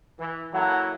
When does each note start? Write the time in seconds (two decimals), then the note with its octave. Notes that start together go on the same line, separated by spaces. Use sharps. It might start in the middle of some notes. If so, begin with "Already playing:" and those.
0.19 E3
0.53 F#3 A#3 E4 A4 F#5 A#5